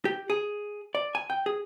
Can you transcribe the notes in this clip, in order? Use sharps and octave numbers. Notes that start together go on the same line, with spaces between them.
G4
G#4
D5
G#5
G5
G#4